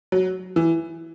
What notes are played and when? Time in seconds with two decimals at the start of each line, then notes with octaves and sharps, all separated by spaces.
0.12 F#3
0.56 E3